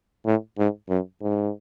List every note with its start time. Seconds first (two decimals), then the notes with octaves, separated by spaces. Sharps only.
0.25 A2
0.58 G#2
0.89 F#2
1.22 G#2